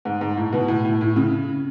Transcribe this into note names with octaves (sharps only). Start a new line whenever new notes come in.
G#2
G#2
A2
B2
A2
A2
A2
C#3